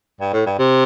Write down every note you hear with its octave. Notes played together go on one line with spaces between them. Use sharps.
G2
A2
G2
C3